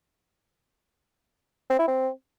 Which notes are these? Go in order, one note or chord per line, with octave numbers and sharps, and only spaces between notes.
C4
E4
C4